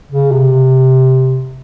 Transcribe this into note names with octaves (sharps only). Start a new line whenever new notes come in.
C#3
C3